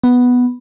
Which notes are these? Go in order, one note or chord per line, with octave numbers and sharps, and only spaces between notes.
B3